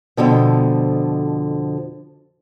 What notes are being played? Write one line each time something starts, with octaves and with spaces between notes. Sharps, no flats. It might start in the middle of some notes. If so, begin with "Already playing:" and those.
F2 B2 D3 F3